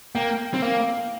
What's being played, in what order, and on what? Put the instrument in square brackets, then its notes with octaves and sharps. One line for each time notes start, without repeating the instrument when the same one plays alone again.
[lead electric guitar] A#3 [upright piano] G5
[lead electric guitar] C4
[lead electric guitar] A#3 [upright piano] F5